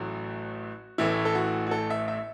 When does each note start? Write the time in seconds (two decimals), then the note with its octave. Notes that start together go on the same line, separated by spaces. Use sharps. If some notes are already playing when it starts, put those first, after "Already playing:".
Already playing: A1 A2 F#3 A3 F#4
0.98 A1 A2 E3 A3 E4
1.25 A4
1.35 F#4
1.67 F#4
1.71 A4
1.90 E5
2.08 E5